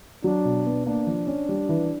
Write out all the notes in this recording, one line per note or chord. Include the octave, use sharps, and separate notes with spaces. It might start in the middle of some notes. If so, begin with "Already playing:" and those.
F#3 D4
B2
B3
A#3 D4
F3
C#4
G3
E3